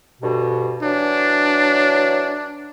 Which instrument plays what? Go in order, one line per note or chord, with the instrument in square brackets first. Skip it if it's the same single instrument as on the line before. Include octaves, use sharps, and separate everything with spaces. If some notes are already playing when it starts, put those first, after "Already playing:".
[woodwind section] D2 G2 B2
[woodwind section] E3 F#3 C#5 [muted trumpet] D4